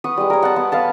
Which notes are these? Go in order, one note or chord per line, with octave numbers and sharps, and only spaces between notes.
B4 F#5 C#6 D#6
G3 G#3
A#4 C#5
F#5 A5
B3
B4 F5 A5